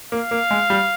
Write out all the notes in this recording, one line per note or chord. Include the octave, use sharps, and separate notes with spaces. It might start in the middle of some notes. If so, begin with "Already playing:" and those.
A#3 F5
A#3
G#3
G3